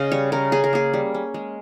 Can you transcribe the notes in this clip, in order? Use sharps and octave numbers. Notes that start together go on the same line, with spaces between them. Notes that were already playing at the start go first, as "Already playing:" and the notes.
Already playing: C#3 C#4 D#5 F5
G3 C#5
C#3 A#4
C#4 G#4
A#4
A#3 G#4
G3
C#4
G#3